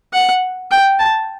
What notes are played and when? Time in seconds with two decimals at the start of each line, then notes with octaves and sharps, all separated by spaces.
0.13 F#5
0.71 G5
0.99 A5